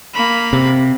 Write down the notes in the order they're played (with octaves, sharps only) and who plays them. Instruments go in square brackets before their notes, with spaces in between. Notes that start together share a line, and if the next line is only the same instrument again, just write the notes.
[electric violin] A#3 B5
[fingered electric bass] C3